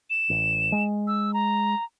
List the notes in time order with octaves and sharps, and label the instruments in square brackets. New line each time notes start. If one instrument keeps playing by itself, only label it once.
[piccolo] E7
[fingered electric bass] A1
G#3
[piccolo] E6
A#5